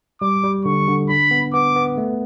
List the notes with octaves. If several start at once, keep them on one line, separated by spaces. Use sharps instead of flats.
G3 D6
G3
D3 C#6
D3
D4 B5
B3
B3 D6
B3
A3